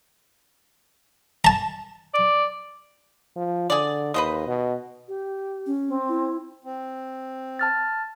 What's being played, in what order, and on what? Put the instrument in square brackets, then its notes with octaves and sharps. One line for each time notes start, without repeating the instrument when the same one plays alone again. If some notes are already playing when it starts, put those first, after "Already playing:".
[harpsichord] A5 A#5
[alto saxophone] D5
[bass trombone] F3
[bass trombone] D3 [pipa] G#4 D5
[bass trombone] D#2 [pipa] B4 C5 D#5
[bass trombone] B2
[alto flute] G4
[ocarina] C#4
[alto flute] C4
[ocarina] E4
[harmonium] C4
[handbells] A5 F6 A6